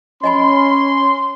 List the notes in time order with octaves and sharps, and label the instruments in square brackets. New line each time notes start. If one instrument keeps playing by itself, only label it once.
[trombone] C#4 [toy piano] D#5 G#5 B5 [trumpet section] C6